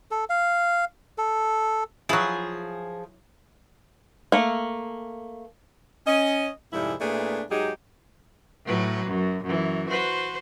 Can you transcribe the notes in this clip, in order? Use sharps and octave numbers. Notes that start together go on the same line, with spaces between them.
A4
F5
A4
F3 F#3 E4 G#4
A3 A#3
C#4 D#5
F2 G#2 C3 G3 G#3 E4
A#2 A3 B3 D4 E4 G#4
G#2 F#3 G#3 D#4 G4 G#4
A2 F#3 B4
F#2
F#2 E3
F#4 B4 C5